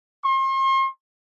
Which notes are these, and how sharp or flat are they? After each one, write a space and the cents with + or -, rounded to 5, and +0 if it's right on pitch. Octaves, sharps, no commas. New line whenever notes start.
C6 +40